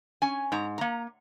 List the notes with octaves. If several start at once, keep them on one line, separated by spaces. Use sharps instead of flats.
C#4 G#5
G#2 A#5
A#3 A#5